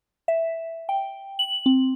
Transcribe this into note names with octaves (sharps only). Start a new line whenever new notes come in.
E5
G5
F#7
C4